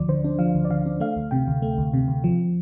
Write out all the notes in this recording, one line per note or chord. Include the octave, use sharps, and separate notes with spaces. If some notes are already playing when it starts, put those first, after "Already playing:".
Already playing: D2 F3 D5
D3 C5
D4
F3 F5
D2
D5
D3 F5
D4
A3 F5
D2
C3 G5
D2
A3
D2
C3
D2
F3